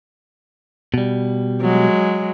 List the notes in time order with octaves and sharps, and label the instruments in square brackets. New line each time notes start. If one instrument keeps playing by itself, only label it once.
[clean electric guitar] B2 G3
[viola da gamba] F#3 G#3